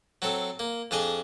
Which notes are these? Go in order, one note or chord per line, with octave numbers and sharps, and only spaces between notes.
F#3 C4 A4
A#3
F2 D4 G#4 D#5